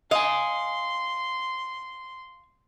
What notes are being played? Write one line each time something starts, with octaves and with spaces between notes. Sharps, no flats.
D#5 F5 G#5 C6